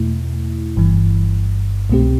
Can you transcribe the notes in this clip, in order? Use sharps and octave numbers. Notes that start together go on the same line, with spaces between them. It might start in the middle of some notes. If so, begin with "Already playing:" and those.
Already playing: E2 B2 A3 E4
G1 G2 E3
C2 B2 A3 C4 G4